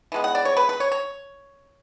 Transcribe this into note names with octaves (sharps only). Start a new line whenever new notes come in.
E3 G#3 B3
F#5
D5
C#5
B4
B4
C#5
C#5